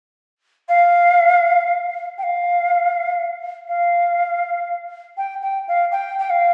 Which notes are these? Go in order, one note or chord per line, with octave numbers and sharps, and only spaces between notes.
F5
G5
F5
F5
G5
G5
F5
G5
G5
F5